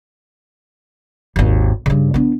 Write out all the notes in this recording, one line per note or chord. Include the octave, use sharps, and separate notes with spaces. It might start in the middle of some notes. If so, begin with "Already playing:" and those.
G#1 D#2
G2 C#3
B3 D4